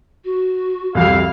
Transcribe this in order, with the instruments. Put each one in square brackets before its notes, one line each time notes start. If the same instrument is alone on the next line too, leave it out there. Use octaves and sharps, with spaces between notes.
[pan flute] F#4
[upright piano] C2 F2 [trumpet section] E4 F5